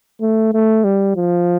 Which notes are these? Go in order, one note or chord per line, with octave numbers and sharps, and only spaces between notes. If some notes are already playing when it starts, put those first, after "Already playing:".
A3
A3
G3
F3